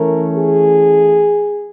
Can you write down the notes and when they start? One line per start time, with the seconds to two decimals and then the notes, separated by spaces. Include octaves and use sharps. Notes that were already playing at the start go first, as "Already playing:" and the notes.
Already playing: E3 A3 C#4 A#4
0.36 G#4